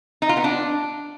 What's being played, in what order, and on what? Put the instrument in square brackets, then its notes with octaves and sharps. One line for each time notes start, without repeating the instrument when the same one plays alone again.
[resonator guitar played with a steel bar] D#4
F4
B3
D4